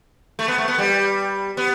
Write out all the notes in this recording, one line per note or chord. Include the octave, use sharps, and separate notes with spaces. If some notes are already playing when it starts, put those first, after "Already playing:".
A3
B3
A3
B3
G3
B3